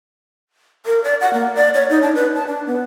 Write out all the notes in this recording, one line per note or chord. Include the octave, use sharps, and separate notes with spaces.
A#4
D5
F#5
A#3
D5
C#5
D#4
D4
B4
A5
D4
B3